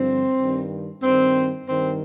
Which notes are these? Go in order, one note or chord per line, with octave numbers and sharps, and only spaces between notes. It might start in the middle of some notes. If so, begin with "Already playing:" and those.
Already playing: G2 D3 F3 C4
G2 D#3
G2 D#3 C4
G2 D#3 C4